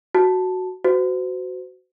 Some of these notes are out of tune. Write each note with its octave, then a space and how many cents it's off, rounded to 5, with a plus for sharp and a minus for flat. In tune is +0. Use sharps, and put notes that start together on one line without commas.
F#4 +0 A5 +0
F#4 +5 C5 -40